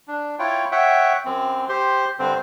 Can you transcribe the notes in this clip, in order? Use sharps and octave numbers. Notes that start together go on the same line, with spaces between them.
D4
E4 F4 C#5 G5
C#5 E5 F#5 G5
F#2 C4
G4 C5 C6
G2 D3 C4 C5